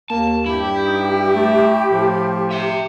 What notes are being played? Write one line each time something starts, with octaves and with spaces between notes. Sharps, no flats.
D#2 A#3 A5
G2 E4 G4
D#4
A3
A2 F3
E5 G5